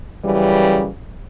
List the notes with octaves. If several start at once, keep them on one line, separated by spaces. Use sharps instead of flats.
F#2 C#3 E3 G3